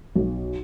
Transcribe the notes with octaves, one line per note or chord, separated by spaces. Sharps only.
B1